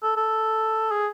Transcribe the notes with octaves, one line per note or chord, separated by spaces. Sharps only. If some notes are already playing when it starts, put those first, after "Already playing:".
A4
A4
G#4